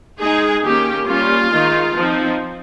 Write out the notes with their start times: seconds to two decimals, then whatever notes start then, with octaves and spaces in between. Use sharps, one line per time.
0.19 G#3 D#4 G#4
0.63 D#3 A#3 C#4 G4
1.06 G3 A#3 C#4 F4
1.50 D#3 G#3 D#4
1.93 F3 C4 D#4